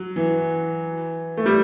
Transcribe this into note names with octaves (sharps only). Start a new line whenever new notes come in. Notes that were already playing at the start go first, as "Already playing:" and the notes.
Already playing: F#3
E3
A3
G3